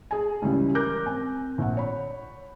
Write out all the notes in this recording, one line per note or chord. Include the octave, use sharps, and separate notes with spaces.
G#4 G#5
C#2 C#3 E3 G3
A#4 D6 F#6 G6 A#6
C4 G#5
A#1 F#5
C#5 B5